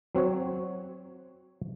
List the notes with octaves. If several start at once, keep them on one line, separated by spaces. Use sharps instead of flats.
F#3 C4 F#4 C#5